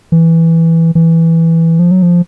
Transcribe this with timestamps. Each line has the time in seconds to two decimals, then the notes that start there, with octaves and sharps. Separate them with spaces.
0.12 E3
0.95 E3
1.79 F3
1.91 F#3
2.02 F3